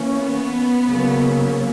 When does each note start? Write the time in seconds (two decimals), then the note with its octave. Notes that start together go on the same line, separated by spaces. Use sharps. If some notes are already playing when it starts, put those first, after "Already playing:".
Already playing: E3 A#3 C#4
0.18 B3
0.87 C#3 F#3 A#3